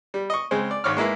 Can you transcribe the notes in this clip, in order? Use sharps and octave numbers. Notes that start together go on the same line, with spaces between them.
G3
D#5 C#6
C#3 G#3 C4
D5
G#1 C#5 D6 F6
G#3 A#3 E4 B4